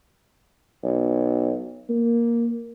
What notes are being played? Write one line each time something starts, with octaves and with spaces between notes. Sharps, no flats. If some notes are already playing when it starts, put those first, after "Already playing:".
B1
A#3